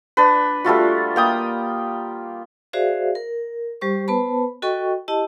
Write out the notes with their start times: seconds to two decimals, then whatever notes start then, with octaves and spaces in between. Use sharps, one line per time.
0.17 D4 B4
0.64 G3 A3 F4 F#4
1.16 A#3 G5 D#6
2.73 F#4 G#4 C5 D5 E5 F5
3.15 A#4
3.81 G3 G4 C5 C#6
4.08 B3 B4 C5 A5 B5
4.62 F#4 A4 D#5 G5 C#6
5.08 E4 G4 D#5 A5